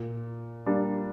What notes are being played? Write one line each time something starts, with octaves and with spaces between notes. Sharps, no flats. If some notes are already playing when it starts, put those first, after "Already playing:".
Already playing: A#2
G3 A#3 D4